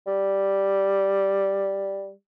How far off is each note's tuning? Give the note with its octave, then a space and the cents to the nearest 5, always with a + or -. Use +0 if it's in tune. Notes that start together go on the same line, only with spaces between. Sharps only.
G3 +0